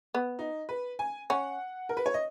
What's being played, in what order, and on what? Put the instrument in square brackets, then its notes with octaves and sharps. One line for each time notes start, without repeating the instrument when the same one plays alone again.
[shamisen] B3
[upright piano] D#4
B4
G#5
[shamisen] C#4 [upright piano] F#5
[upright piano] A#4
B4
C#5
D#5